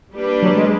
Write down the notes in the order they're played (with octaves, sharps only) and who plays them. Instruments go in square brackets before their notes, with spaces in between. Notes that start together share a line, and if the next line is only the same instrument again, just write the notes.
[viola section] G3 A#3 D4 G4 B4
[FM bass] F#3
G#3